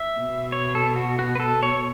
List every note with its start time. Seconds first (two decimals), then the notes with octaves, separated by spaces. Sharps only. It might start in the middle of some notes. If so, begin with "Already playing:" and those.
Already playing: E5
0.20 B2
0.52 C#5
0.75 A4
0.96 F#4
1.19 F#4
1.35 B4
1.40 A4
1.63 C#5